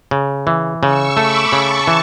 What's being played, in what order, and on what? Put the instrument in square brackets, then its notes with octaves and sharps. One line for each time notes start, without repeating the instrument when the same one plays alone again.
[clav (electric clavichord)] C#3
E3
[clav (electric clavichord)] C#3 [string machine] C#6 E6
[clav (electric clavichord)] A3 [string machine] B5 D6
[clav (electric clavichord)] C#3 [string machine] A5 C#6
[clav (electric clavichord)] E3